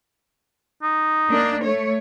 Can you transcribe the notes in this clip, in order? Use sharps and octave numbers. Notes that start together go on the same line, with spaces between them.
D#4
A#3 D4
A3 C#5